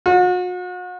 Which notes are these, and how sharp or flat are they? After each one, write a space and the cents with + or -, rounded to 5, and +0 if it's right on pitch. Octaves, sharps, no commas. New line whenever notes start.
F#4 -40